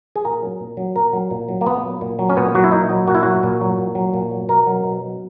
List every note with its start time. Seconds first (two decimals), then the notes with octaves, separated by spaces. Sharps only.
0.16 G#4
0.25 A#2 A#4
0.42 F#3
0.60 A#2
0.77 F#3
0.96 A#2 A#4
1.13 F#3
1.31 A#2
1.48 F#3
1.61 A#3
1.66 A#2 B3
1.83 F#3
2.01 A#2
2.19 F#3
2.29 C#4
2.37 A#2 B3
2.55 F#3 F#4
2.64 E4
2.72 A#2 D#4
2.90 F#3
3.07 A#2 F#4
3.15 E4
3.23 F#3 F#4
3.43 A#2
3.61 F#3
3.78 A#2
3.95 F#3
4.14 A#2
4.31 F#3
4.49 B2 A#4
4.67 F#3
4.84 B2
5.01 F#3